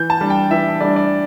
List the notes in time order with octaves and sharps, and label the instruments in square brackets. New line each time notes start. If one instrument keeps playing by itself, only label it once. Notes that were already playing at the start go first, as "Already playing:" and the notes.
Already playing: [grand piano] E3 G6
A5
G3 D4
G5
E3 E5
G3 D4 D5
D5